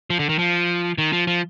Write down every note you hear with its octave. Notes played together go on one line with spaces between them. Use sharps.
F3
D3
D#3
F3
D#3
F3
F3